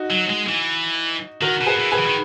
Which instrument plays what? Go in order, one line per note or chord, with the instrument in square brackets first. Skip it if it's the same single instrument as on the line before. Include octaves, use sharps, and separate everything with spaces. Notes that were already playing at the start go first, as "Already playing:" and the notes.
Already playing: [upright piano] D#4 F#4
[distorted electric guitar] F#3
G#3
E3
[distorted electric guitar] D#3 [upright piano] F#4 A#4
[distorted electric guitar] B2
[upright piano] G#4 B4
[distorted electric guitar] E3
[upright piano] G#4 B4
[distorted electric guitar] E3
D#3